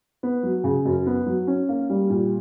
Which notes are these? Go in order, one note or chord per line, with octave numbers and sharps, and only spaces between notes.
B3
F#3
C#3
F#2
B3
F#3
C#4
A#3
G3
A#2